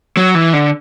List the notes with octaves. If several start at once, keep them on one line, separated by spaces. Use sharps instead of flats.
F#3
E3
D3